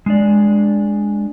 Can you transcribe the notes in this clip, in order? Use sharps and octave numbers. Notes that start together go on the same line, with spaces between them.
G#3 D4 D5